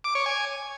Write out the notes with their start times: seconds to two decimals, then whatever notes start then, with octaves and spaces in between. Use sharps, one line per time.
0.04 D6
0.15 C#5
0.26 G#5